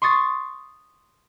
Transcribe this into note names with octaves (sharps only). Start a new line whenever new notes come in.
C6 C#6 D#6 A6 C7